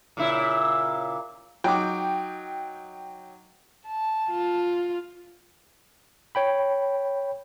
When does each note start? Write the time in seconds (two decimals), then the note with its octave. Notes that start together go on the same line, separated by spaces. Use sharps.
0.17 A#2 C#3 E4
1.64 F#3 D#4 G5 D6
3.87 A5
4.31 F4
6.35 C#5 G5 B5